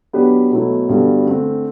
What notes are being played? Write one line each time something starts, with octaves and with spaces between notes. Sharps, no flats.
F#3 B3 D4 G4 B4
B2 F#3 A3 E4
G2 D3 G3 B3 F#4
D3 A3 C4